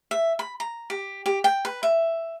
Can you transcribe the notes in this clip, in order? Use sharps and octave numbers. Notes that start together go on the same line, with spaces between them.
E5
B5
A#5
G4
G4
G5
B4
E5